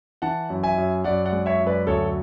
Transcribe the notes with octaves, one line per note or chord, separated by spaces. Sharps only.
E3 F#5 A5
F#2
E5 G#5
F#2
F#2 D5 F#5
D5 F#5
G#3
C#5 E5
F#2
B4 D5
D2 A4 C#5